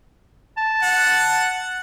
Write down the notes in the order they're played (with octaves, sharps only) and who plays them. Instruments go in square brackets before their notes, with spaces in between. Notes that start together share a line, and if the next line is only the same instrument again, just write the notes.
[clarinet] A5
[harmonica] F#5